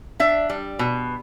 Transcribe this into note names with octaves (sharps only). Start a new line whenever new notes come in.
D4 E5
G3
B2